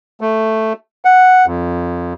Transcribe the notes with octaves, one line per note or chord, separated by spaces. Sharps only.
A3
F#5
F2